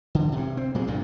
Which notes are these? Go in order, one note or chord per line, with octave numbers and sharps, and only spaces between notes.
D3
G2 C3
C4
A#2 F#3 G#3
C2 G2 A#2